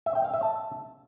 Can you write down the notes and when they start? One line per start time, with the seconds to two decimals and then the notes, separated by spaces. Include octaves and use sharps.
0.06 E5
0.15 G5
0.24 F5
0.33 E5
0.43 A5